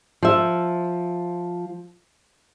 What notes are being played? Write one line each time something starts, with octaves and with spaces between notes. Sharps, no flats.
F3 E5